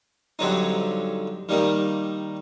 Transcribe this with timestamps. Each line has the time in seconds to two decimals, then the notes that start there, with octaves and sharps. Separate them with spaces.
0.39 G2 D3 F#3 C4 D#4
1.49 D#3 G3 A#3 D#4